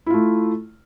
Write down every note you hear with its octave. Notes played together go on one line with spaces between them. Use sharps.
A3 E4 F4